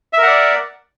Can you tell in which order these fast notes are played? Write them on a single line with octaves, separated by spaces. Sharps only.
E5 A#4 F#5 D5